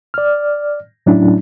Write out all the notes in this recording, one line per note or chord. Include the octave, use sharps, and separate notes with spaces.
D5 F6
A2 F#3 A3 C#4 D4 E4